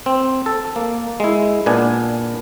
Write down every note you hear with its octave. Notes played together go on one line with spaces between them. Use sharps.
C4
A4
A#3
G#3 E4
A#2 B3 D4 G#5